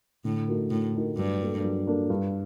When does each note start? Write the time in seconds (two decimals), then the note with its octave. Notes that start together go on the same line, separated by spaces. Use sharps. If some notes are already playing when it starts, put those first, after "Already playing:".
0.25 A2 D3
0.48 A3 D#4 F#4 A#4
0.71 A2 D3
0.95 A3 D#4 F#4 A#4
1.17 G2 F#3
1.40 A#3 D4 A4
1.64 F#3
1.87 A#3 D4 A4
2.10 G2